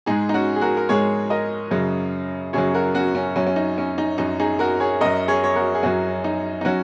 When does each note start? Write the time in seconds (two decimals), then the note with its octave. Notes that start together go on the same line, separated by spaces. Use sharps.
0.06 G#2 G#3 D#4 G#4
0.29 D#4
0.34 C#4 F#4
0.56 G#4
0.61 F#4 A#4
0.77 A#4
0.89 G#2 G#3 G#4 C#5
1.30 A#4 D#5
1.71 F#2 C#3 F#3
2.53 F#2 C#3 F#3 G#4 C#5
2.74 F#4 A#4
2.94 C#4 F#4
3.15 C#4
3.36 F#2 F#3 C#4
3.47 C#4
3.56 D#4
3.78 C#4
3.98 D#4
4.18 F#2 F#3 D#4
4.40 D#4 G#4
4.59 F#4 A#4
4.80 G#4 C#5
5.01 F#2 F#3 A#4 D#5
5.28 G#4 C#5
5.44 C#5
5.55 F#4 A#4
5.75 G#4
5.83 F#2 F#3 C#4 F#4
6.24 D#4
6.61 D#4
6.65 F#3 C#4 F#4